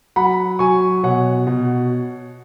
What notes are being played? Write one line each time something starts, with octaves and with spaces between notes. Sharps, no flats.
F#3 F#5 B5
F#3 G#5 C#6
B2 C#5 F#5
B2